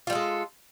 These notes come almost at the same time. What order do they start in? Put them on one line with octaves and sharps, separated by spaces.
F4 G3 A4 G#3